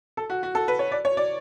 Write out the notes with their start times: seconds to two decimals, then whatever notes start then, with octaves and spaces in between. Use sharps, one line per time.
0.17 A4
0.30 F#4
0.43 F#4
0.55 A4
0.68 B4
0.79 C#5
0.92 D5
1.05 C#5
1.17 D5